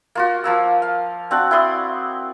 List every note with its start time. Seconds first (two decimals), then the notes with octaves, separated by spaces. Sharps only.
0.15 A#3 F4 F#4
0.44 F3 A#3 E6
0.82 F5
1.31 C4 D4 F#4 F#5
1.51 E4 D5 C6 D#6